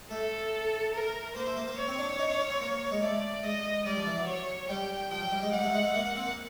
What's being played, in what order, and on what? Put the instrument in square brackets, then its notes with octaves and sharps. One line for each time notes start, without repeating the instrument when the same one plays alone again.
[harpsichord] A3 [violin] A4
[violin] A#4
[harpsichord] A#3 [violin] C5
[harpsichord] A3
A#3
A#3
[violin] C#5
[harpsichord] C4
D4
D4
D#4
D4
C#4
C4
A#3
G#3
[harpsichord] A3 [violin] D5
[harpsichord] G#3 [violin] D#5
[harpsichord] G3 [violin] D5
[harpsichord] F3
E3
F#3
[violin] C#5
[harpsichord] G3 [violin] G5
[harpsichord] F3 [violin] G5
[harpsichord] F#3
G3
G#3
[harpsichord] G3 [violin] F#5
[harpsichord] A3
G#3
A3
A#3
A#3
C4
A#3